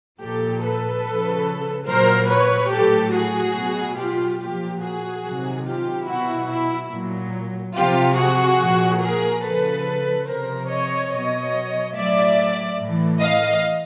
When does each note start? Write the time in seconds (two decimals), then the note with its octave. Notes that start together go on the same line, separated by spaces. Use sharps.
0.21 A#2 F3 G4 A4
0.63 A4 B4
1.05 C#3 F3
1.89 A#2 F#3 A#4 C5
2.31 B4 C#5
2.73 A2 F#3 G4 A4
3.14 F#4 G#4
3.56 B2 F#3
3.98 F4 G4
4.40 A#2 F3 F4 G4
4.82 F#4 G#4
5.24 C3 D#3 F#3
5.66 F4 G4
6.07 B2 F#3 E4 F#4
6.50 E4
6.92 A#2 F#3
7.75 C3 F3 F4 G4
8.17 F#4 G#4
8.60 A#2 F3
9.01 G#4 A#4
9.43 C#3 F3 A4 B4
10.27 C3 F3 A#4 C5
10.69 C#5 D#5
11.11 B2 F#3 C#5 D#5
11.94 A2 F#3 D5 E5
12.79 A2 E3
13.20 D#5 F5